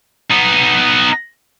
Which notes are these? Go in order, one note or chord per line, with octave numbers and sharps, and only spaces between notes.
B3 D#4